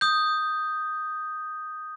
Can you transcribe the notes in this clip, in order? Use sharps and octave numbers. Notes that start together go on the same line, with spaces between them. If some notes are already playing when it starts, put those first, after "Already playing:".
D#6 G6